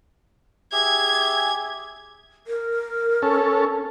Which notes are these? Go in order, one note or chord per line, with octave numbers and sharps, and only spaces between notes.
G4 G#4 E5 G#6
A#4
C#4 A4